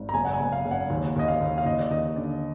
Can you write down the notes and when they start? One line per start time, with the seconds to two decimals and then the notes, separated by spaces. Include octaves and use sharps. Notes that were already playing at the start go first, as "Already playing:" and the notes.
Already playing: G#1
0.09 A#5
0.14 F#1 G#5
0.25 F#5
0.33 G#5
0.39 F#1
0.52 F5
0.65 F#1
0.71 F#5
0.90 D#2
1.16 D#2 D#5
1.28 F5
1.41 D#2
1.58 F5
1.65 D#2 D#5
1.80 D5
1.91 D#2 D#5
2.16 D3 D5